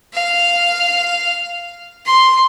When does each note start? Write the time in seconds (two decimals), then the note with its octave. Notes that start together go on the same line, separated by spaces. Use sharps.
0.13 F5
2.06 C6